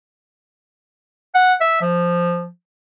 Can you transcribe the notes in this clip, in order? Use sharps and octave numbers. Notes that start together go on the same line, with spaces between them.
F#5
E5
F3